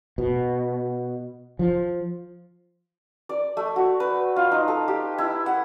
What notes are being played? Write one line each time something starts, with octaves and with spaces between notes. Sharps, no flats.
B2
F3
D5
A3
F#4
B4
F4
D#4
A4
G4
E4
F#5